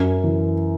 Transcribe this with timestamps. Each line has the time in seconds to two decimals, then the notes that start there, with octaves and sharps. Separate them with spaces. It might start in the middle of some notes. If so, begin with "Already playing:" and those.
Already playing: F#2
0.24 E3